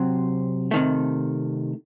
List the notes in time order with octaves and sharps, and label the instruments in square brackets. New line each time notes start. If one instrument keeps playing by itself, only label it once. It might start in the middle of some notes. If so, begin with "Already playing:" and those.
Already playing: [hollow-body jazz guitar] C3 F#3 C4
C3 D#3 A3